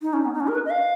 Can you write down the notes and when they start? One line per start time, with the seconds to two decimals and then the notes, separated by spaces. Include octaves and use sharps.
0.02 D#4
0.13 C#4
0.25 B3
0.34 D#4
0.40 C#4
0.47 A#4
0.55 B4
0.65 D#5
0.70 F5